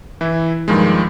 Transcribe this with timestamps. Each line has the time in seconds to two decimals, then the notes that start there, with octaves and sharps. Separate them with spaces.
0.21 E3 E4
0.68 G2 A#2 D#3 F3 G#3